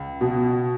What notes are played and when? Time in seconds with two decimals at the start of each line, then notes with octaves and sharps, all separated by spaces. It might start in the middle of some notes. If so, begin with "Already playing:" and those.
Already playing: C#2
0.21 B2